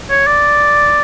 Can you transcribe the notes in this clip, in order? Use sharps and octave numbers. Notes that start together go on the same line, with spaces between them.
C#5
D5